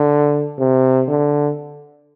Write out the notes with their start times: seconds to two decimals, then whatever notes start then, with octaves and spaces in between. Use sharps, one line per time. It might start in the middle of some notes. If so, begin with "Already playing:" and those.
Already playing: D3
0.59 C3
1.08 D3